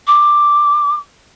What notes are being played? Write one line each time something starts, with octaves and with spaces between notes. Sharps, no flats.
D6